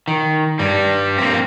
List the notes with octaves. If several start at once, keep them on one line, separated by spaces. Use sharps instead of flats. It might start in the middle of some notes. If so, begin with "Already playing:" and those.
D#3
G2 G3
A#3 C4